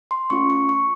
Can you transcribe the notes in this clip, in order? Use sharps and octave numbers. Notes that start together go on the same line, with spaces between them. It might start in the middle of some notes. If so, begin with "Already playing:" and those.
C6
A3 C#4 F4 C#6
C#6
C#6